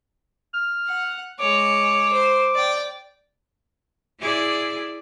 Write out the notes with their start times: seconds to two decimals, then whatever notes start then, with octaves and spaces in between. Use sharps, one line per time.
0.54 F6
0.87 F#5
1.39 G#3 C#5 D6
2.12 C5
2.54 D5 G5
4.20 E4 G#4 D5